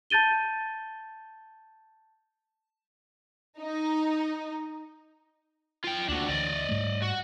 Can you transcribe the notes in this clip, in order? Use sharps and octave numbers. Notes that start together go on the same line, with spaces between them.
A5 G6 A6 D#7 G7
D#4
F4 G5
D2 A#3 D4 F#4
D2 E3 D5 D#5
G#2 G3 A3
F#4